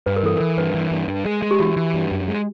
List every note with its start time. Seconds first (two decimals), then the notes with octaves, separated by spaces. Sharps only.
0.06 G2 B4
0.16 A#4
0.23 E3 A4
0.36 E3 A#4
0.58 G2 B4
0.74 E3
0.91 G2
1.08 G2
1.25 G#3
1.42 G#3
1.51 G4
1.60 E3 F#4
1.76 E3
1.94 G2
2.11 F#2
2.28 G#3